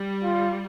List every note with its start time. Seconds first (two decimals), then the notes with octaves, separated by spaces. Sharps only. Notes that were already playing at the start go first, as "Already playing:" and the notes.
Already playing: G3
0.24 F4